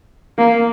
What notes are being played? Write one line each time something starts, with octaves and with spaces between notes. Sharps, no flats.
A#3